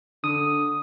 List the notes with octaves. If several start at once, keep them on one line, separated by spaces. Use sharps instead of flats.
D3 D#6